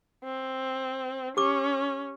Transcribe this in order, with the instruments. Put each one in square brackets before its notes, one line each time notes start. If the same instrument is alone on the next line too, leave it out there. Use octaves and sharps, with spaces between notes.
[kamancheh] C4
[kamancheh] C#4 [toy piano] G4 D6